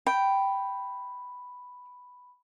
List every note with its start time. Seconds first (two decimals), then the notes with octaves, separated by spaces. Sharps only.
0.07 G5 B5